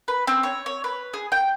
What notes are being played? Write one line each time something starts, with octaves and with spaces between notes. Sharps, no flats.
B4
C4
C#5
C#5
B4
G#4
G5